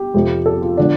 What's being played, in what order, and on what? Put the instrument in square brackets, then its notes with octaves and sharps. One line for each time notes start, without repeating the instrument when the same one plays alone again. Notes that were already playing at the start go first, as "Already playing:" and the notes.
Already playing: [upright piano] G4
F2 C3 F3
A4
F4
D3 F3 D4